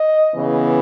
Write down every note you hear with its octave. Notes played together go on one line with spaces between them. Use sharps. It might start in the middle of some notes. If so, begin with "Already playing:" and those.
Already playing: D#5
C#3 E3 B3